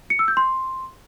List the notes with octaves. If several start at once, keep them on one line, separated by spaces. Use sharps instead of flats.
C#7
E6
G6
C6